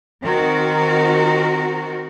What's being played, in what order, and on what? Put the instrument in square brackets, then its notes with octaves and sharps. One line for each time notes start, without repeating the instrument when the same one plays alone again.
[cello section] D#3 C4 F#4 A#4